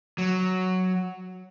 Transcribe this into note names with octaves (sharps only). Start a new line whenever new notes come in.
F#3